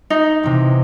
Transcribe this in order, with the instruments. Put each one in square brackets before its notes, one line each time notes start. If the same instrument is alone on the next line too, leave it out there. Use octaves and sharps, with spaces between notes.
[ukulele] D#4
[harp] E2 C3